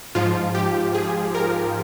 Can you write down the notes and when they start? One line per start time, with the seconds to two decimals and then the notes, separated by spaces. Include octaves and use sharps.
0.15 G#2 F3 F4
0.55 G4
0.94 G#4
1.35 A#4